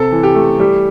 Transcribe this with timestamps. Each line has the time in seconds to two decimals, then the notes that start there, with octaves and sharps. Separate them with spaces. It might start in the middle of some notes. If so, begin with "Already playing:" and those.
Already playing: C3 A4
0.11 E3
0.23 G4
0.35 A3
0.59 G3 G4